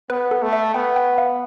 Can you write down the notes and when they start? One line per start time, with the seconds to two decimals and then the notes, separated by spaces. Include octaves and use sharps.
0.10 B3 B4
0.31 A4
0.42 A3
0.53 E5
0.74 B3 G5
0.96 G5
1.18 F5